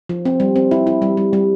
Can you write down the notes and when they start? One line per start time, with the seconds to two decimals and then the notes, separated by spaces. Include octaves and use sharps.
0.09 F3
0.25 C4
0.40 G3
0.56 C4
0.71 E4
0.87 E4
1.02 G3
1.17 G3
1.33 G3